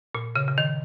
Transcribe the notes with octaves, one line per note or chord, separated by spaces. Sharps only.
A#2
C#3
C#3
D#3